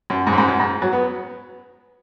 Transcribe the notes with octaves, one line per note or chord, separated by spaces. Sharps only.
F#2
G#2
F#2
G#2
F#2
G#2
F#3
B3